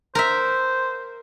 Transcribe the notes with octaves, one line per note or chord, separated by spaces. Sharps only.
A#4 C5 E5